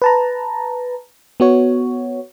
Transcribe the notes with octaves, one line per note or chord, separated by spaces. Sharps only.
B4 A5 A#5
B3 F#4 C#5